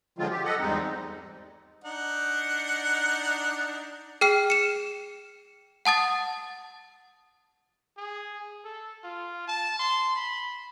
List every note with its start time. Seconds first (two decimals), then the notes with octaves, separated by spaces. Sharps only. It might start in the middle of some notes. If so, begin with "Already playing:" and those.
0.18 D3 F3 F#3 G#3 C4 F4
0.30 G4
0.44 A4 D#5 F#5
0.59 E2 G#2 G3 G#3 C4 D#4
1.84 D4 D#4 F#5
4.21 G#4 G5 F6 C7
4.50 C#7 E7
5.85 F#5 A5 D#6 A6
7.97 G#4
8.65 A4
9.04 F4
9.48 A5
9.79 C6
10.16 B5